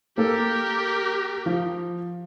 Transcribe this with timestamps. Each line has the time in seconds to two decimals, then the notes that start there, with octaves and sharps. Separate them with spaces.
0.18 A#3 G4 A4 A#4
1.46 F3